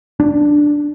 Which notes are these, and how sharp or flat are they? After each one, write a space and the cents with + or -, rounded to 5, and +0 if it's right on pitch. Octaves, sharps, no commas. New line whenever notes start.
D4 +0